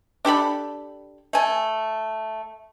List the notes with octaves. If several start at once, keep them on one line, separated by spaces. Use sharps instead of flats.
D4 G4 A4 B5
A3 G#5